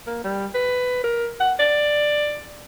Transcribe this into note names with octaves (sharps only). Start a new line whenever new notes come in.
A#3
G3
B4
A#4
F#5
D5